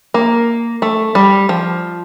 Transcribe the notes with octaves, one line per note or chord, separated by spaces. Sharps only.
A#3
A3
G3
F3